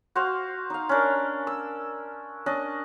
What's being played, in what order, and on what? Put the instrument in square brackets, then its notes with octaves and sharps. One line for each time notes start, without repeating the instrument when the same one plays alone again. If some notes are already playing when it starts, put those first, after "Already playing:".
[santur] F#4 C5 F5
D#4 F5
C#4 D4 A#4
E6
C#4 D4 D#5